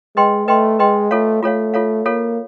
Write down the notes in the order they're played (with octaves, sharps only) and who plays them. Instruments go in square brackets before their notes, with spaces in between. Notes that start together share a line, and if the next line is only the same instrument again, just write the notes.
[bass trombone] G#3 [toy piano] B4 D#5 G5 C6
[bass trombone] A3 [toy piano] B4 D#5 G5 C6
[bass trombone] G#3 [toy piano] B4 D#5 G5 C6
[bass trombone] A3 [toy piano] F4 A4 C#5 F5
[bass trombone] A3 [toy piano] F4 A4 C#5 F5
[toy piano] F4 A4 C#5 F5
[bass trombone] A#3 [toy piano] F4 A4 C#5 F5